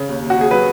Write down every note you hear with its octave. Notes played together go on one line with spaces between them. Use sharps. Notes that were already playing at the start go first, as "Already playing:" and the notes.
Already playing: C#3
D#2
D#2
F#4
D#2 G#4
F#3 B4